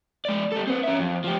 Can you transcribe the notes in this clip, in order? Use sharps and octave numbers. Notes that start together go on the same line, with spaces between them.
G#3 D5
G3 A4
C4 B4
C#4 E5
F2
F3 G4